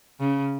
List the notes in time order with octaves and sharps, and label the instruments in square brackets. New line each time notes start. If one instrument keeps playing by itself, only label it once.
[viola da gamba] C#3